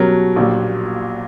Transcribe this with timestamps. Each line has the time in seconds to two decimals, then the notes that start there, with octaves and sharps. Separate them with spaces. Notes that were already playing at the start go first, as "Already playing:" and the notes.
Already playing: B2 F#3 G3 C#4 F#4 A#4
0.36 A#1 A#2 G3